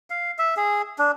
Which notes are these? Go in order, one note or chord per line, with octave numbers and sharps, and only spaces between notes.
F5
E5
G#4
D4